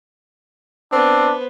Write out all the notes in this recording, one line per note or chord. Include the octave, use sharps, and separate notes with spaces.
B3 C4 D4 C5